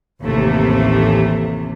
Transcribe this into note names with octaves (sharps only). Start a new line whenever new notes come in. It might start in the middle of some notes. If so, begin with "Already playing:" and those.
A1 D#2 C3 E3 A3